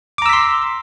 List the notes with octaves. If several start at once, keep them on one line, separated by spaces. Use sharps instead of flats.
A#5 C6 D6 E6 B6